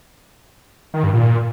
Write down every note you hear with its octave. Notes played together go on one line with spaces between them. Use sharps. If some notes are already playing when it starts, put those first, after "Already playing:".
D#3
G2
A#2